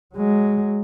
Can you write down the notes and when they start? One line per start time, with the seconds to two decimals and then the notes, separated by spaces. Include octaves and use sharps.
0.14 F#3 G#3